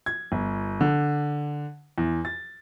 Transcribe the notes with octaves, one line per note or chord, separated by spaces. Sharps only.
G#6
G1
D3
E2
A6